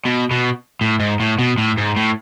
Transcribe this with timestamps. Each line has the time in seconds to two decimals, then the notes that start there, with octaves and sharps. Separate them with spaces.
0.05 B2
0.31 B2
0.81 A2
1.00 G#2
1.20 A2
1.39 B2
1.58 A2
1.78 G#2
1.96 A2